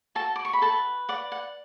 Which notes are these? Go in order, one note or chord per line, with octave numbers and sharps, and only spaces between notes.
F#4 A4 A5
D6
C#6
B5
A4 B4 A5
D5 F#5
F#5